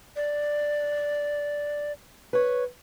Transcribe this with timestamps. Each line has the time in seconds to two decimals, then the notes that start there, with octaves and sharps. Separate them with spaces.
0.16 D5
2.33 B4 C#5